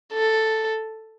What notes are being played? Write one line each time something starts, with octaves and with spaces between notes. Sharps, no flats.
A4